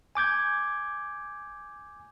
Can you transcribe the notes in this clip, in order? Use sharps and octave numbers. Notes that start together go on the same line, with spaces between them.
G#5 D6 G6 G#6